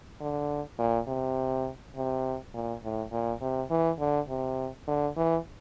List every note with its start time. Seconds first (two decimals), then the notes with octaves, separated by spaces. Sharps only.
0.20 D3
0.79 A#2
1.08 C3
1.96 C3
2.54 A#2
2.83 A2
3.12 A#2
3.41 C3
3.70 E3
3.99 D3
4.28 C3
4.87 D3
5.16 E3